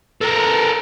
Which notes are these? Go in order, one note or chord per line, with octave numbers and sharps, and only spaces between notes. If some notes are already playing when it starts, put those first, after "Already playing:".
A4 A#4